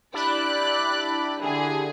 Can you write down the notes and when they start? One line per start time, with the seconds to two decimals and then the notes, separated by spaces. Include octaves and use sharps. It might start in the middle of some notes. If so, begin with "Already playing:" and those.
0.14 D4 E4 G4 D5 B5 F#6
1.40 D3 G#4